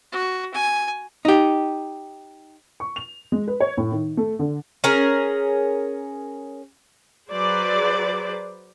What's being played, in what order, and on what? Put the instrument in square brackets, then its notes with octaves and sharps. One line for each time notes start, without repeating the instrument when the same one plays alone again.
[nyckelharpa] F#4
G#5
[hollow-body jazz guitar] D#4 G4
[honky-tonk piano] C#6
F7
G#3
B4
C#5
A2
D#3
A3
D3
[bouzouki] C#4 G#4 A#4
[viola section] F#3 G#4 B4 C5 D5